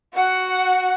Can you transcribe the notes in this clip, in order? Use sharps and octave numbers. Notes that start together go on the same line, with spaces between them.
F#4 F#5